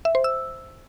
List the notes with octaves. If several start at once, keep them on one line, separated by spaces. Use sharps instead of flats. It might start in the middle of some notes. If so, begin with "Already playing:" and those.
E5
C5
E6